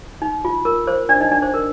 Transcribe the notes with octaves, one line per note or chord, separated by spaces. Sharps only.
D#4
F4
A#4
C5
D4 D5
D#4 D#5
D4 D5
C5
A#4